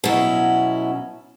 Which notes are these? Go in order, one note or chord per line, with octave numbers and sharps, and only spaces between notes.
B2 F#3 C#4 E4